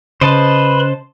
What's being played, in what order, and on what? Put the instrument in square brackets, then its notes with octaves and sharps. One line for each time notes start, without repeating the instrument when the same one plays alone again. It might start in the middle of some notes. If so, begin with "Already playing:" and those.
[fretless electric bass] C#3 [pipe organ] B4 B5 C6 [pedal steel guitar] C5 D#5 A5